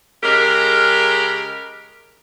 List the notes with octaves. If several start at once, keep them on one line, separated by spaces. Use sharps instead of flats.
C#3 G#3 G4 A#4